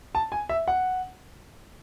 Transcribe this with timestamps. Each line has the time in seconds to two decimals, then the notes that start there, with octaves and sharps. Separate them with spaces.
0.15 A5
0.32 G#5
0.49 E5
0.68 F#5